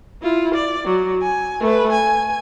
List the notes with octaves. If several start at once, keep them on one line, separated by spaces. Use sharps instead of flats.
E4 F4
D5
F#3
G#5
A3 B4
G#5